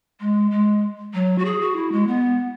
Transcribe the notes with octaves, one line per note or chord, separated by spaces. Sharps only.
G#3
G#3
F#3
F#4
G#4
F#4
E4
G#3
B3